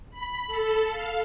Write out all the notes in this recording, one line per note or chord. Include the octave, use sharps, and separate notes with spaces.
B5
A4
F5